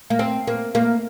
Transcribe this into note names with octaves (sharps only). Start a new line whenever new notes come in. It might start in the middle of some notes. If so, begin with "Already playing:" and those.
A#3
C4
A#3
A#3